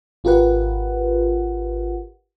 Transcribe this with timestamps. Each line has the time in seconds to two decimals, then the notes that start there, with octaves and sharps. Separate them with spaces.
0.24 G#1 F4 G4 A#4 B4 F#5